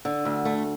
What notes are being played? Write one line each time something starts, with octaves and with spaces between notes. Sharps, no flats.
D3
D2
A3